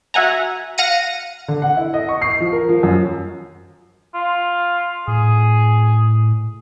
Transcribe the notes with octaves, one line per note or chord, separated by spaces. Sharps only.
F#4 E5 F#5 G#5 A#5
F5 F#5 A#6 C#7 D#7
D3
F#5
E4
D#5
C#6
C7
F3
A#4
F3
F#2
F4
A2 G#4